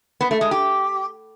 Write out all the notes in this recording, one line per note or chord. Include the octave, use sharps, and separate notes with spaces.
B3
A3
G#3
G4